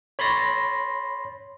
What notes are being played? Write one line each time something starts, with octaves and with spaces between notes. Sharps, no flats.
C#5 B5 C6 A6 A#6